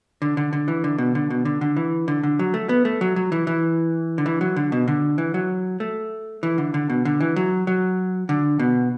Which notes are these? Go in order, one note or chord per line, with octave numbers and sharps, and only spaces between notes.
D3
D3
D3
E3
D3
B2
D3
B2
D3
D3
E3
D3
D3
F#3
A3
B3
A3
F#3
F#3
E3
E3
D3
E3
F#3
D3
B2
D3
E3
F#3
A3
E3
D3
D3
B2
D3
E3
F#3
F#3
D3
B2